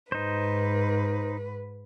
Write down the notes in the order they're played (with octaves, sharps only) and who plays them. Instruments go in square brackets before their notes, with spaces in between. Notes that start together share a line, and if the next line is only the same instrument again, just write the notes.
[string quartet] G#2 B4 [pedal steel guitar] D#4 C5